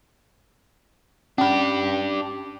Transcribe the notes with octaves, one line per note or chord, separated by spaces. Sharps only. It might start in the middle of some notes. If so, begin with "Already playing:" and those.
C#4 D4 G4 B5